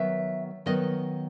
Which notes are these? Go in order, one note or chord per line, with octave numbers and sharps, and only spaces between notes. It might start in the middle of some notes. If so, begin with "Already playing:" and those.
Already playing: D#3 F#3 B3 E5
D#3 F#3 B3 D#5